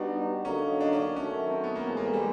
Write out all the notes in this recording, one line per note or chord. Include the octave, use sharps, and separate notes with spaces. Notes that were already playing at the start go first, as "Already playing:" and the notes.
Already playing: G3 B3 D4 D#4 F#4
D3 F#3 A#3 C#4 D#4
D4
C#4
D#3 F#3 A3 C#4
C4
B3
A#3
A2 E3 G#3 B3
A#3
A3
G3